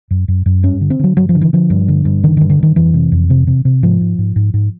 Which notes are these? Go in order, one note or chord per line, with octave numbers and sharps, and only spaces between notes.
F#2
F#2
F#2
G2 C#4
D3
C4
D3 F#3
G2 F#3
F3
D3
E3
D3 F3
G2
D3
G2
D3 D#3
G2 D#3
D3
G2 D#3
F2 E3
C3
F2
C3
C3
C3
G#2 F3
G#2
G#2
G#2
G#2